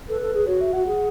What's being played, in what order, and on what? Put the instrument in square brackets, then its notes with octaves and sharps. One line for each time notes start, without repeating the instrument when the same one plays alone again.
[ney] A4 [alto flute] B4
[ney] A4
G#4
[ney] F#4 [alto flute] C#5
[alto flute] E5
[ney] F#4 [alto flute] F#5
[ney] G#4